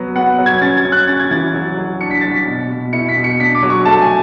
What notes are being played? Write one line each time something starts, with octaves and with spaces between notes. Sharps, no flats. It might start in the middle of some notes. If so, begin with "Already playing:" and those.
Already playing: F#3 B3
B3 F#5
F#3
G#6
C#4 A6
G#6
C#4
F#6
C#4 A6
G#6
E3 A6
F#3
F#3
D4 C#7
B6
F#3 A6
B6
B2
B2
E4 C#7
B6
B2
C#7
D4 B6
D6
F#3
C#6
A3 A5
G#5